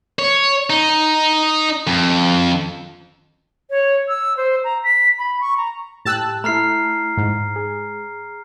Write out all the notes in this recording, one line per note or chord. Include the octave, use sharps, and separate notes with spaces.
C#5
D#4
F2
C#5
E6
C5
A#5
B6
B5
C#6
A#5
A2 G4 G5 A5 E6 F#6
A3 E4 A#5 F6 C7
G#2
G#4